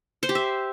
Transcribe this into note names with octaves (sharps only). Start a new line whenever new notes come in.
C5
G4
E5